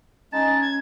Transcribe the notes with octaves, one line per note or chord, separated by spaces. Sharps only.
G#3 C#4 D#4 A5 A6
G#6